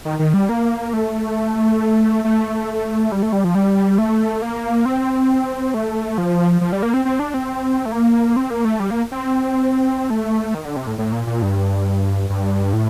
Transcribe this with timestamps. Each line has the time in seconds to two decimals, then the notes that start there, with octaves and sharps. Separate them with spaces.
0.05 D#3
0.19 D#3
0.34 G3
0.49 A#3
0.93 A3
2.24 A3
3.12 G3
3.23 A3
3.32 G3
3.44 F3
3.55 G3
3.98 A3
4.42 A#3
4.85 C4
5.74 A3
6.18 F3
6.61 F3
6.72 G3
6.83 A#3
6.94 C4
7.05 C4
7.19 D4
7.34 C4
7.85 A3
7.92 A#3
8.36 C4
8.50 A#3
8.65 A3
8.80 G3
8.90 A#3
9.12 C4
10.10 A3
10.54 D#3
10.65 D3
10.76 C3
10.87 A2
10.98 A2
11.12 A#2
11.27 A#2
11.42 G2
12.30 G2
12.73 A2